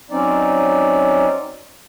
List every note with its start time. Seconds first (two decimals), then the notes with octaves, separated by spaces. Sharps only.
0.10 F#3 C4 C#4 D#4 D5